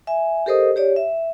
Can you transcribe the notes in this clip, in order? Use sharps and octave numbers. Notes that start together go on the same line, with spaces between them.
E5 G#5
G4 A4 A#4 C5 D#5 D#6
G4 C#5 D5
E5